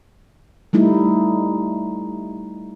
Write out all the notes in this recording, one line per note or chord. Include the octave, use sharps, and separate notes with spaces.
G3 A3 D#4 E4